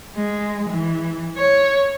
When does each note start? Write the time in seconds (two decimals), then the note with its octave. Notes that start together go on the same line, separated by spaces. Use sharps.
0.15 G#3
0.69 E3
1.38 C#5